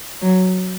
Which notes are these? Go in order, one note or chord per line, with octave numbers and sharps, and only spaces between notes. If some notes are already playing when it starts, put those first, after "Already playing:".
F#3